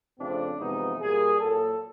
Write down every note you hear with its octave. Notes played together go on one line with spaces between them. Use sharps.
F2 C#3 F3 A3 C4 D4
F2 C3 E3 G#3 B3 D#4
A#2 G3 A#3 G#4
A#2 F#3 A#3 A4